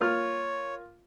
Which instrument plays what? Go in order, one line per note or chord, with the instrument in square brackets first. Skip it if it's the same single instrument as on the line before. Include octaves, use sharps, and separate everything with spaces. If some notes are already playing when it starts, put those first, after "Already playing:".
[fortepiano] A#3 F4 F6 [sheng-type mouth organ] C#5